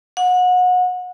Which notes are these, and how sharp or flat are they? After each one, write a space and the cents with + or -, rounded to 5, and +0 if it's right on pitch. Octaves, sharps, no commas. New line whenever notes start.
F#5 -30